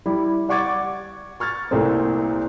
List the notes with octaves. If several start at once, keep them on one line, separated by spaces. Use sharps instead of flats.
G3 E4
D5 F#5 C#6 D6 G#6 A6
C#6 F6 G#6 A6
C2 A#2 A3 A#3 C4